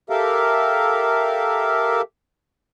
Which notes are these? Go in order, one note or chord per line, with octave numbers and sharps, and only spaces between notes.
G4 A4 A#4 E5 F5